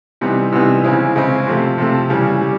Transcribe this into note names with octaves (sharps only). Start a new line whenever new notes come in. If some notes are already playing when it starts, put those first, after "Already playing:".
C3 E3 G3 B3 D#4
C3 E3 G3 B3 D#4
C#3 E3 G#3 C4 E4
C#3 E3 G#3 C4 E4
C3 F3 A3
C3 F3 A3
C#3 E3 G3
G3